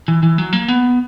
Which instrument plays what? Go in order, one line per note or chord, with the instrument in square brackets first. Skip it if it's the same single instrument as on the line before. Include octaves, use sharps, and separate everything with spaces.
[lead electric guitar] E3
E3
F#3
A#3
B3